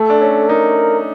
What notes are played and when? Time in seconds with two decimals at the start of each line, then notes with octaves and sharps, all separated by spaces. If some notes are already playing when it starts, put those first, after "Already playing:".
Already playing: A3 A4
0.10 D4
0.21 C#4
0.49 D#4 A#4